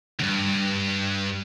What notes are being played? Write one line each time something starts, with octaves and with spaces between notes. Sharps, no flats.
D2 G2